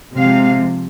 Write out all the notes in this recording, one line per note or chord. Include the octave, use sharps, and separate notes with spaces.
C3 F3 G#3 F5